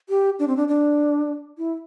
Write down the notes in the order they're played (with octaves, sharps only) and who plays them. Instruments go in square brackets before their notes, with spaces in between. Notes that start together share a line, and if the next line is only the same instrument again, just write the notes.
[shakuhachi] G4
D4
C4
D4
D4
E4